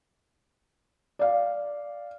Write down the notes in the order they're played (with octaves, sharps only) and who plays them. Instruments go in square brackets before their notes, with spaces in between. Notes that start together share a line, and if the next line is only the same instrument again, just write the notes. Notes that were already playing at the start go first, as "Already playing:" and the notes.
[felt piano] D5 F5